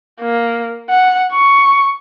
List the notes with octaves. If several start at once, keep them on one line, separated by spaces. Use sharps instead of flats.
A#3
F#5
C#6